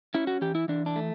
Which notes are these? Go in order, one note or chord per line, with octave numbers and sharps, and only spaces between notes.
C#4 E4
F#4
E3 G4
E4
E3 D4
D4
A3